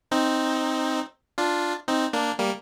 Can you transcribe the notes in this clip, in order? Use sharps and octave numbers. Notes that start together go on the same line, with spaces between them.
C4 D#4
D4 F4
C4 D#4
A#3 D4
G3 A#3